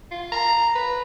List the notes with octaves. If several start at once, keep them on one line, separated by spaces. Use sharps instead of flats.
F4
A#5
B4